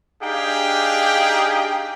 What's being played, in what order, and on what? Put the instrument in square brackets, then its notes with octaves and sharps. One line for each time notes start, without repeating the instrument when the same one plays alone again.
[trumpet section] D4 D#4 G4 G#4 F5 G5